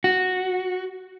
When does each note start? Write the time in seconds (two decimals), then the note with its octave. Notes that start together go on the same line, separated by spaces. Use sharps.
0.04 F#4